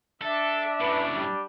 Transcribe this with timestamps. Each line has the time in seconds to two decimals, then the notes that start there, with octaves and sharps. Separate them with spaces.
0.22 D4 A4 E5
0.81 F#2 A2 B4
1.15 G3